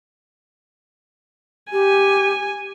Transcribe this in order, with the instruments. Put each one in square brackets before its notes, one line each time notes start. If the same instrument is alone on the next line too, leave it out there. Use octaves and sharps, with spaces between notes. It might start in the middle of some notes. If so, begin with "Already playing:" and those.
[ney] G4 [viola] G#5